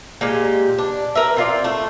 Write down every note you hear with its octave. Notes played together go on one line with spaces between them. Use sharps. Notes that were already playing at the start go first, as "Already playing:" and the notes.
A#2 G#3 G4
D4
A#4 B4 E5
C4 F4 D5
A3